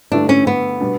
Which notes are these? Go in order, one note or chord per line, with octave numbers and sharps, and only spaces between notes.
G2 D3 A3 D4 E4 G4
C#4
B3
B2 G3 D4